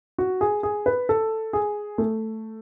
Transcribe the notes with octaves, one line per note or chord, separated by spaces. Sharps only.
F#4
G#4
G#4
B4
A4
G#4
A3